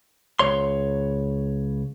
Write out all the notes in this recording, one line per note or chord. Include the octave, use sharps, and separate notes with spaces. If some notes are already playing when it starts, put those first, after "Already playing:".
C#2 C#5 C6